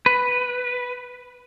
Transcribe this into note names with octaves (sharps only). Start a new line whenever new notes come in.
B4